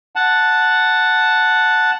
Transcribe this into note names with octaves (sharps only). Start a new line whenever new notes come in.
F#5 A5